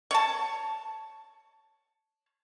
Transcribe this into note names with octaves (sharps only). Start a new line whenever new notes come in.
C#5 A5